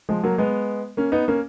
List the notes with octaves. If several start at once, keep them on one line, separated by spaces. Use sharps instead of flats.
F3 G#3
F#3 A#3
G#3 B3
A#3 C#4
B3 D#4
A#3 C#4